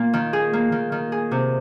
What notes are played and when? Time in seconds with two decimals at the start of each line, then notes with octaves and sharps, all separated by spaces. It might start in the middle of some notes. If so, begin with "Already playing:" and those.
Already playing: A#2 A#3
0.13 D#3
0.33 G#4
0.53 A#3
0.72 D#3
0.92 D#3
1.12 G#4
1.31 C3